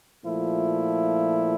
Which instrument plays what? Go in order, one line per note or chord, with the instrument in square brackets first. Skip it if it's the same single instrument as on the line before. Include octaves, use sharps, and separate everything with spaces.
[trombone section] A#2 F3 A3 E4